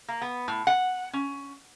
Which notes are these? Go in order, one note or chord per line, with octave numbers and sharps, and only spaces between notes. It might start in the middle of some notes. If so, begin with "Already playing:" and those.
A#3
B3
A2
F#5
C#4